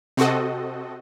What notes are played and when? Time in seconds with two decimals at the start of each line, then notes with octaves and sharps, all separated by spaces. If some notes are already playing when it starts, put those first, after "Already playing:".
0.17 C3 C4 F#4 A4 D#5